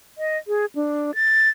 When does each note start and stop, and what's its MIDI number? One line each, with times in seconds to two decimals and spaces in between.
0.18 0.38 75
0.48 0.66 68
0.75 1.15 62
1.15 1.49 93